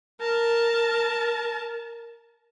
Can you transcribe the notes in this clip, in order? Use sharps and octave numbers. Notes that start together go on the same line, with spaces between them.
A#4 A5